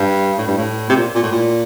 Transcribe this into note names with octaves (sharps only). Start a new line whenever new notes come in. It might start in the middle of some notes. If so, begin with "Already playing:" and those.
Already playing: G2
A2
G2
A2
C3
A#2
A#2
A2
A#2